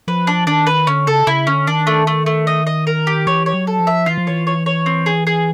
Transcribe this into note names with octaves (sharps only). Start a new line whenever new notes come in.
F3 B4
D4
D#3 D4
B4
D3 C#4
C#3 A4
C#3 E4
D3 C#4
D#3 D4
A3
A3
A3
D#5
D#5
A#4
G4
E3 C#5
C#5
F#3
A4
F3
E5
E3 F4
F3
E3 C#5
C#5
C#5
C4
G#4
G#4